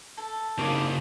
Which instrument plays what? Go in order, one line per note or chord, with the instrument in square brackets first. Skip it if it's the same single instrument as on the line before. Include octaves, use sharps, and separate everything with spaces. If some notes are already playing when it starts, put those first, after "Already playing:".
[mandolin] A4
[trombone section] G#1 [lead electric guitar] C#3 A#3 [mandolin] C#5 D6